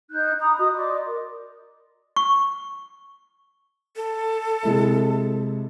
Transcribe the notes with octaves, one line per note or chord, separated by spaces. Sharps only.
D#4 F#6 G6
A#5 B5 D#6
F#4 D#5 D#6
D5 D#5 C6 D6
A#4
C#6
A4
C3 G#3 E4